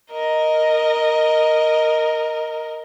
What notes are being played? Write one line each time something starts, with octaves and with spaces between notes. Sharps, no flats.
A#4 D#5